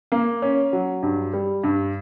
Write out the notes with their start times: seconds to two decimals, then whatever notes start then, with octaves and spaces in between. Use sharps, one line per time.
0.12 A#3
0.42 C#4
0.73 F#3
1.03 G2
1.33 G3
1.64 G2